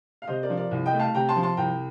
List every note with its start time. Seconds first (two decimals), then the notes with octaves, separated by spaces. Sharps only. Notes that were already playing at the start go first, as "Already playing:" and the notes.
0.22 F5
0.27 C3 C5 D#5
0.43 A#4 D5
0.50 F3
0.56 A#4 D5
0.71 C2
0.86 D#5 G5
0.93 A3
0.99 F5 A5
1.14 C3 G5 A#5
1.29 A5 C6
1.36 F3
1.43 A5 C6
1.57 C2 G5 A#5